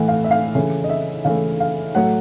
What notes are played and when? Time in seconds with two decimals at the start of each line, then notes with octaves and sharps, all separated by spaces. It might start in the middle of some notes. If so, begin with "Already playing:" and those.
Already playing: A2 E3 A3 F#5
0.08 F5
0.24 E5
0.31 F5
0.55 C#3 E3 A3
0.84 D#5
0.89 E5
1.25 C#3 E3 A3 F5
1.60 F5
1.95 A2 F#3 A3 F#5